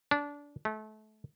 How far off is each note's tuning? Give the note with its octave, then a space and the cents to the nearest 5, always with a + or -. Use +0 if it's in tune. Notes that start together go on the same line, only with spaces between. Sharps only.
D4 -20
A3 -30